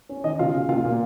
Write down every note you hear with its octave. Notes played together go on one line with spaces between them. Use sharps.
C#4
D#3 D#5
C#3 F4 F5
C#3
A#2 F4 F5
A#2